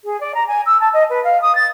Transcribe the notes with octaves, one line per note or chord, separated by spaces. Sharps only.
G#4
D5
A#5
G#5
E6
A5
D#5
B4
F5
D#6
A6